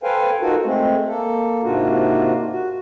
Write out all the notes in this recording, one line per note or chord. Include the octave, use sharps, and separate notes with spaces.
A4 B4 C5 F5 G5 G#5
D#4 F4 F#4 A4 A#4
G#3 A3 C4
A#3 A4
G#2 C3 A#3 D4 F4 F#4
F#4